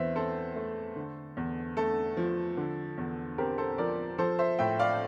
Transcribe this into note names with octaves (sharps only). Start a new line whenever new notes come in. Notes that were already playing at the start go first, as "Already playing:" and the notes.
Already playing: E2 E3 C5 E5
C4 A4 C5
A3
D3
E2
A3 A4
F3
D3
E2
C4 G4 A#4
A4 C5
F3 A#4 D5
F3 A4 C5
C5 E5
A2 E5 G5
D5 F5